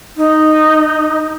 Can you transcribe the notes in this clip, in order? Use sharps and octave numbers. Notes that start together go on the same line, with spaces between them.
D#4